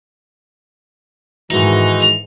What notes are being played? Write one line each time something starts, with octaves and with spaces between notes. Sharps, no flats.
G#2 D#3 E3 G#3 D#4 F#4